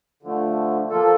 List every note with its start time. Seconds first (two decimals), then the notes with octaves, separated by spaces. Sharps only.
0.23 D3 F3 A3
0.90 F3 A#3 F4 A4